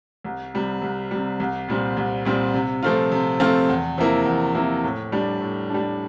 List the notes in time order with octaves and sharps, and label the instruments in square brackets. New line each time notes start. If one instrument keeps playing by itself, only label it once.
[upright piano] C2
C3 G3
C2
C3 G3
C2
A#2 G3 C4
C2
A#2 G3 C4
C3
F3 A3 C4 F4
C3
F3 A3 C4 F4
E2
C3 F3 A#3 E4
E2
C3 F3 A#3 E4
A2
G3 D4
A2
G3 D4